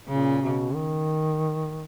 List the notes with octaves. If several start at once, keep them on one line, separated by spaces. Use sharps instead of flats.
A#2 C#3
B2
D#3